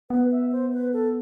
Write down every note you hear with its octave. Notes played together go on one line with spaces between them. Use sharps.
B3 B4
E5
C5
B4
A4